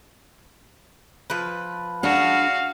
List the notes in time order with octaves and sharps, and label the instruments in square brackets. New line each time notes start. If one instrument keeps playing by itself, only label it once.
[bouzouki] F3 B4
[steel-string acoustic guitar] D4 G#4 [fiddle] F#4 [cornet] F5